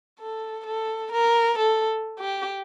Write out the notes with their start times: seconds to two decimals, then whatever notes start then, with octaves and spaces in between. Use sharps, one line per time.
0.20 A4
0.66 A4
1.12 A#4
1.58 A4
2.20 G4